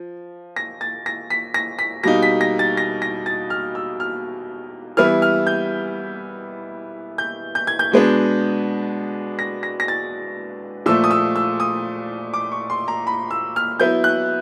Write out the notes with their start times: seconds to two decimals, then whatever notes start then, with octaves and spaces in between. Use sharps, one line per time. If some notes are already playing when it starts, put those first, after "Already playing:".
Already playing: F3
0.56 A#6
0.81 A6
1.06 A#6
1.30 B6
1.54 A#6
1.79 B6
2.03 B2 G3 A#3 D#4 A#6
2.23 B6
2.41 A#6
2.59 A6
2.77 A#6
3.02 A#6
3.26 A6
3.50 F6
3.75 E6
4.00 F6
4.97 E3 G3 B3 E4 F6
5.22 F6
5.47 G6
7.18 G6
7.55 G6
7.67 G#6
7.79 G6
7.92 B2 G#3 B3 D4
9.39 A#6
9.63 A#6
9.80 A#6
9.88 A6
10.86 A#2 F3 A3 E6
11.04 D#6
11.11 E6
11.36 E6
11.60 D#6
12.34 D6
12.52 C#6
12.70 C6
12.88 A#5
13.07 B5
13.31 E6
13.56 F6
13.80 F#3 B3 E4 G6
14.04 F#6